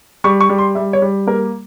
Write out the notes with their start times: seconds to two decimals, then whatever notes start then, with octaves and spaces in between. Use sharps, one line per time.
0.24 G3 C#6
0.41 C#6
0.49 G3
0.58 C6
0.75 G3 E5
0.93 C#5
1.02 G3
1.27 A#3 A#4